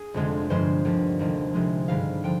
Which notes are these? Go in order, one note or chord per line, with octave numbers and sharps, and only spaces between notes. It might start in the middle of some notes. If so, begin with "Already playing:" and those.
Already playing: G#4
F1 F2 D3 G#3
G1 G2 F3 G#3 C5
D#2 D3 F3
F1 D#2 D3 F3
C2 C3 F3 G#3
G#1 G2 D3 G3 F5
D3 F3 G5